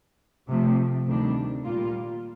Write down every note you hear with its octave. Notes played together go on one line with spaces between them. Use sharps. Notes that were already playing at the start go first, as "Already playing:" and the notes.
C3 F3 A3
D2 C3 D#3 G3 D4
A#2 G3 A#3 F4